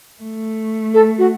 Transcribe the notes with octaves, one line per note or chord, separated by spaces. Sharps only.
A3
A4
F#4